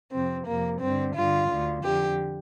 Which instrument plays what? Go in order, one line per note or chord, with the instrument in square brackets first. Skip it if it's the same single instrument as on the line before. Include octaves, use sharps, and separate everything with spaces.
[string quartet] F2 C3 C4
F2 C3 A#3
G2 D3 C4
G2 D3 F4
D2 D3
F2 D3 G4